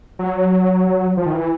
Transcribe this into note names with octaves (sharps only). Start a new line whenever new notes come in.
F#3
F3
D#3
E3